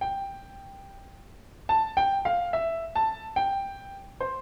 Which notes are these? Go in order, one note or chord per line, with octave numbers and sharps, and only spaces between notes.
G5
A5
G5
F5
E5
A5
G5
C5